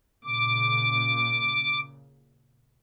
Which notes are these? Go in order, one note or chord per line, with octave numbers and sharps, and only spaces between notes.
A#2 C#3 D6